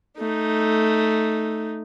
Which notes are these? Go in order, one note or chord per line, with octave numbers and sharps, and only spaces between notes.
A3 D#4